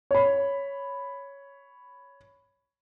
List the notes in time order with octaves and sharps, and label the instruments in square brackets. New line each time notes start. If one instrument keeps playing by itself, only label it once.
[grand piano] C#5 B5